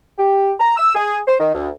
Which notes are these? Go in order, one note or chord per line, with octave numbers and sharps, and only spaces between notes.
G4
A#5
E6
G#4
C5
D#3
D2